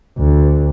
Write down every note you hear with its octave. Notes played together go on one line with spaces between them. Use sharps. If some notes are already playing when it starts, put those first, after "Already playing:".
D2